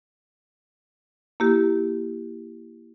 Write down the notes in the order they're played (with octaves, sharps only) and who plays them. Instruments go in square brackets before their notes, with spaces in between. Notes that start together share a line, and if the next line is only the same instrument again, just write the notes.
[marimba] A#3 E4 G4